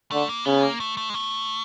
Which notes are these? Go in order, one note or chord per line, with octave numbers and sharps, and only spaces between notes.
D3 A3
A#3
C#3 B3
A#3
A3
A3
G#3
A3